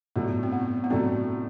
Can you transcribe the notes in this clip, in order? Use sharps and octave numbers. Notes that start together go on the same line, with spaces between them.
A2 F#3 A3 B3 D4
C4
B3
B3
A2 F#3 A3 C4 D4